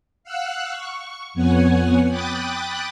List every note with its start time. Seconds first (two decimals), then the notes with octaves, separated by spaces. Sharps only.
0.24 F5 F#5 E6 F#6
0.70 C#6
1.34 F2 B3 C#5 F#5 G#5
2.08 G5 B5 D6 D#6 F#6 A6